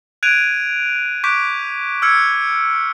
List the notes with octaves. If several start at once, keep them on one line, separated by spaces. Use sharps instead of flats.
F#6 G#6 D7 D#7 F7
C#6 D6 F#6 G6 B6 D7
E6 F6 G#6 C#7